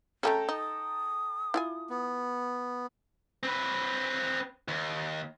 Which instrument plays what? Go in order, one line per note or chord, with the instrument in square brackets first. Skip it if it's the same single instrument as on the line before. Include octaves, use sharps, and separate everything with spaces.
[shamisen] A3 A#3 C#4 [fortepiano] A4 G5 A#5
[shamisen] D#4 [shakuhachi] D#6
[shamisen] E4 F4 G#5
[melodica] B3
[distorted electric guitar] C4 B4
D#2